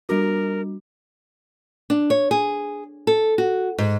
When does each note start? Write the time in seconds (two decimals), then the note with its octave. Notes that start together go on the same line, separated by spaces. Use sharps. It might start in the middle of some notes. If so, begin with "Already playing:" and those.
0.09 G3 D4 F#4 A#4
1.90 D4
2.10 C#5
2.31 G#4
3.07 A4
3.38 F#4
3.78 G#2